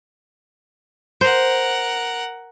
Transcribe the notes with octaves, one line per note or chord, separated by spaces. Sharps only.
A#4 C5 F#5